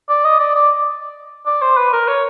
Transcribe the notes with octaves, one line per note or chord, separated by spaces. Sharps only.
D5
D#5
D5
D5
D5
C5
B4
A#4
C#5